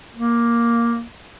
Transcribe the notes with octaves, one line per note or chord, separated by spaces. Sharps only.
A#3